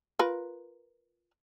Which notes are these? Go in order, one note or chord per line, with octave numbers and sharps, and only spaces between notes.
F4 A#4 B4